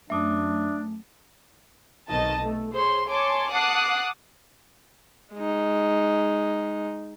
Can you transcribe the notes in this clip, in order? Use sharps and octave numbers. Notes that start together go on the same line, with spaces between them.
F#2 A3 D4 E5 D6 D#6
B1 C3 D#3 D#5 A5 A6
A3
G#4 C5 C#5 C6
C#5 G#5 A5 C6 D6
F#5 A5 D6 D#6 F#6 C7
G#3 D#4